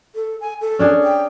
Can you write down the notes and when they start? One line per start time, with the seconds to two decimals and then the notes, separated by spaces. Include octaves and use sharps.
0.15 A4
0.41 G#5
0.61 A4
0.79 C#4 D4 G#4
1.04 G5